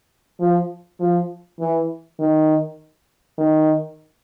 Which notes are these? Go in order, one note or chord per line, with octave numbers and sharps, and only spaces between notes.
F3
F3
E3
D#3
D#3